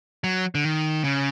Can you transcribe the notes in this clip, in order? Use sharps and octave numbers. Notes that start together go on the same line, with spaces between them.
F#3
D3
D#3
C#3